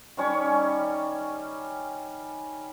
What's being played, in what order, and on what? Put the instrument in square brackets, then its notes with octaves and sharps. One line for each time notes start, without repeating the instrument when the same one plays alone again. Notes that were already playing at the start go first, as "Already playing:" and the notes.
[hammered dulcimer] D#3 G3 C#4 C#5